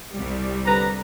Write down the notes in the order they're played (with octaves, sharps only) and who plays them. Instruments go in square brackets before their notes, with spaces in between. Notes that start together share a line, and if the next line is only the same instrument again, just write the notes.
[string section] C2 G3
[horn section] D3 B4 A#5